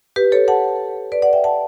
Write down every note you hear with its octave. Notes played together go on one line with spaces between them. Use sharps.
G4 B4
A4 C#5
F#5 A5
B4 D5
D5 F#5
E5 G5
F#5 A5